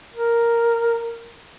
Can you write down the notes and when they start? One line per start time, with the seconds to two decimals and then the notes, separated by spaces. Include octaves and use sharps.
0.13 A#4